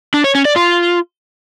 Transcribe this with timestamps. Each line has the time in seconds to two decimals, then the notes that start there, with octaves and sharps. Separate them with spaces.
0.14 D4
0.24 C#5
0.35 C#4
0.45 D5
0.56 F4